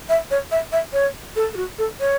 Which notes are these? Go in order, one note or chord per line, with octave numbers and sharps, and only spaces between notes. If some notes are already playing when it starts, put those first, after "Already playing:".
E5
C#5
E5
E5
C#5
A4
A4
F#4
A4
C#5